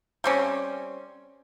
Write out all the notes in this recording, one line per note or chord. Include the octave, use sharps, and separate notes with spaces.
G3 C4 C#4